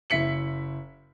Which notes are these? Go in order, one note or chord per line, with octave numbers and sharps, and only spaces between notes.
F#1 E4 B6 C#7 F#7